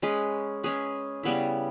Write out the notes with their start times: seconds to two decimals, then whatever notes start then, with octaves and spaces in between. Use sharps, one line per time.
0.02 G#3 C#4 G#4 B4
0.63 G#3 C#4 G#4 B4
1.23 C#3 G3 B3 E4